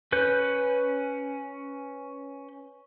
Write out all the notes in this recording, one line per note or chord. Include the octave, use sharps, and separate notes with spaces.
C#4 B4 G6